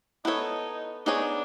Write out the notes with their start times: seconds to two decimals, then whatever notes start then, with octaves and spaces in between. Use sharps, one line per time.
0.25 B3 D#4 E4 A4 C#5
1.06 B3 D4 D#4 G#4 C#5